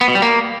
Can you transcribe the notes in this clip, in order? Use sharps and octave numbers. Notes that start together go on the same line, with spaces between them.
B3
B2
G3
A#3